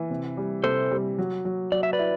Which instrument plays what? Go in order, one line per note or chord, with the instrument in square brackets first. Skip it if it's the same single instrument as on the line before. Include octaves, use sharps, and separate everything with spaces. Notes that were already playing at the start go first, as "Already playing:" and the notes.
Already playing: [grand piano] E3
C3
G3
[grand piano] C3 [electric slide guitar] A4 C5
[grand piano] G3
F#3
F#3
[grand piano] F#3 [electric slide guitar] D5
[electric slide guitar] E5
B4 D5
[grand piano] E4